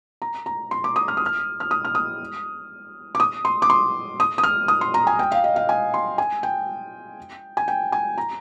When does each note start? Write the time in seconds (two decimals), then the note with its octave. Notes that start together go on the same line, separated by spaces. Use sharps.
0.22 A#5
0.46 A#5
0.71 C6
0.84 D6
0.96 D#6
1.08 F6
1.17 D#6
1.26 F6
1.60 F6
1.71 D#6
1.85 F6
1.95 D#6
3.15 D6
3.20 D#6
3.45 C6
3.62 D6
3.70 C6
4.20 D#6
4.38 D#6
4.43 F6
4.68 D#6
4.81 C6
4.94 A#5
5.07 G#5
5.19 G5
5.32 F5
5.44 D#5
5.56 F5
5.69 G#5
5.94 C6
6.18 G#5
6.43 G5
7.57 G#5
7.68 G5
7.92 G#5
8.18 A#5